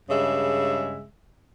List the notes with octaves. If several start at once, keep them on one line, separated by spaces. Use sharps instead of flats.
G2 C#3 G#3 E5